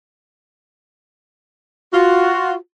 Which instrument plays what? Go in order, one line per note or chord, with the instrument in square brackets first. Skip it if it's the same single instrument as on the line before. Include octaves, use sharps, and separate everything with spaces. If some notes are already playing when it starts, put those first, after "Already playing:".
[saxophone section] F4 F#4